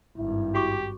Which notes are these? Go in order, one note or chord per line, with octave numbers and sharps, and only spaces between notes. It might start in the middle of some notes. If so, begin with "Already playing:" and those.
G#1 G2 E4
F#4 G4 C#6 D6